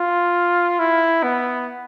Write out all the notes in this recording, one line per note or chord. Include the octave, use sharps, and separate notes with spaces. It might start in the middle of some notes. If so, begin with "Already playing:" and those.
Already playing: F4
E4
B3